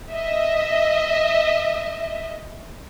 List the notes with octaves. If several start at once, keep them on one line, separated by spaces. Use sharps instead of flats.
D#5 E5